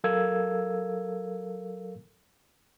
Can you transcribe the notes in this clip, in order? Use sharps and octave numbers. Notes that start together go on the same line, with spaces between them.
F#3 A4 A#4 F5 E6 G#6